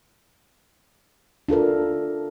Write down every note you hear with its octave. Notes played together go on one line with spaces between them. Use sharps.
D4 F4 A4 A#4